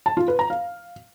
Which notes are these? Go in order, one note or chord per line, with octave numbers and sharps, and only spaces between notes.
A5
F4
B4
A#5
F5